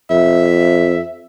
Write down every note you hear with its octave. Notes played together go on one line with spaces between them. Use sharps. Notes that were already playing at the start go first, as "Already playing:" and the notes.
F2 E5